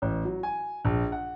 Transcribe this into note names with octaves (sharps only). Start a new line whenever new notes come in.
A1
F#3
G#5
A#1
F#5